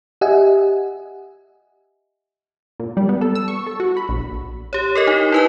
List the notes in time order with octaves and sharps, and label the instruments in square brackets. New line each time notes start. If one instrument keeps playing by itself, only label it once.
[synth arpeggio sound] G4 D#5 E5 F#5 G#5
A#2
G3
B3
A4
E6
C#6
A4
F#4
B5
A#1
[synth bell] G4 C#5
A4 A#4 D#5
D#4
E4 B4 G#5